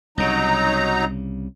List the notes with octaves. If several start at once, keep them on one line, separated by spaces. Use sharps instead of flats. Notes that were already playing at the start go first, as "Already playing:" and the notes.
C2 C#3 F#3 D#4 A#5